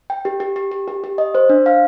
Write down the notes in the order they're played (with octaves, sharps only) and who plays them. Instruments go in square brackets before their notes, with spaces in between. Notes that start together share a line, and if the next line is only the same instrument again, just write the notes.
[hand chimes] G5
G4
G4
G4
G4
G4
G4
D#5
C5
D4
F5